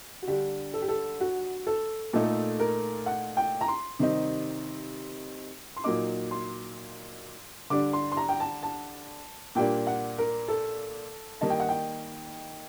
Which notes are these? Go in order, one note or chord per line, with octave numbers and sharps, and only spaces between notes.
F#4
D3 G3 D4 G4
A4
G4
A4
F#4
A4
A#2 A3 D#4 A4
A#4
F#5
G5
A#5
C6
C3 D#3 G3 C4 D#4
C6
A#2 F#3 A#3 D#4 D6
C6
D3 G3 D4 D6
C6
C6
A#5
G5
A5
A5
A#2 G3 A#3 D4 G5
F#5
A#4
A4
D#3 G3 A#3 D#4 A5
G5
F#5
G5